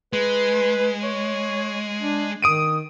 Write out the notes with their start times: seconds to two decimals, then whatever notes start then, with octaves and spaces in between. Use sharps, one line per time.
0.13 G#3 B4
1.03 C#5
2.02 D4
2.42 D#3 D#6 D7 D#7